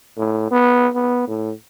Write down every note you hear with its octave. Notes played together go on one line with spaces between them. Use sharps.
A2
B3
B3
A2